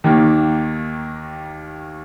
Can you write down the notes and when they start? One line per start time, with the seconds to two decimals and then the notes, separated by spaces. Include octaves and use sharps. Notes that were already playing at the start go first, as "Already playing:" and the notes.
0.04 D#2 D#3 A#3